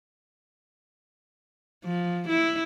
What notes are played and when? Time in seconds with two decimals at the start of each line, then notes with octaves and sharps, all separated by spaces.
1.84 F3
2.29 E4